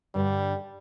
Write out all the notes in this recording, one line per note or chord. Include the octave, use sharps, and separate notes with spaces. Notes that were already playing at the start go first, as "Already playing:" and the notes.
G2 D3 G3